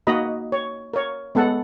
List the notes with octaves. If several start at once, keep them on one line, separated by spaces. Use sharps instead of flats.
A#3 D#4 F#4 D#5 A#5 B5
C#5
A#4 C#5
G#3 B3 A4 F#5